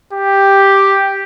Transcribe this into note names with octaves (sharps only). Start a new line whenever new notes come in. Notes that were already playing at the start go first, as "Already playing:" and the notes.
G4